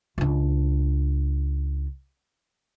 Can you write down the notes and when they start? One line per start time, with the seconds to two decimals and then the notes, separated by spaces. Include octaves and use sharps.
0.18 C#2 D4